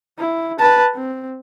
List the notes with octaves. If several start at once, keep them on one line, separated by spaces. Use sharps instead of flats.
E4
B4 A5
C4